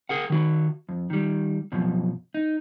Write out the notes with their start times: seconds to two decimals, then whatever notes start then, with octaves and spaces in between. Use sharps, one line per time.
0.09 G#4 A#4 F#5
0.30 D#3 F#4
0.89 F2
1.10 D#3 G3
1.72 F#2 B2 F3
2.34 D#4